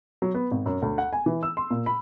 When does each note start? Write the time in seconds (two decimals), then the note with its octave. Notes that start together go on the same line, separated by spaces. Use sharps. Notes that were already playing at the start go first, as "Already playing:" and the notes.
0.22 F#3
0.34 B3
0.51 G#1
0.66 F#2
0.82 D2
0.98 F#5
1.13 G#5
1.26 E3
1.43 E6
1.57 C6
1.70 A#2
1.86 B5